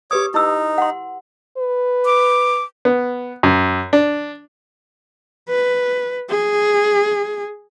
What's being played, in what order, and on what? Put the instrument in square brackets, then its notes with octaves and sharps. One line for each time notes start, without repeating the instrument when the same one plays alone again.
[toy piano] G4 B4 D#6 [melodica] C#5 D6
[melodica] D#4 [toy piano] E4 E6
[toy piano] F#5 C6
[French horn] B4
[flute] D6
[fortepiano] B3
F#2
D4
[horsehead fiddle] B4
G#4